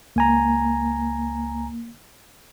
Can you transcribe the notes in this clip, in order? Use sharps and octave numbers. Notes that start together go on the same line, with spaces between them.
C#2 A#3 G#5 A#5